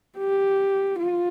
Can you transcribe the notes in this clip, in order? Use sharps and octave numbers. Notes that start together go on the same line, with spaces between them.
G4
F4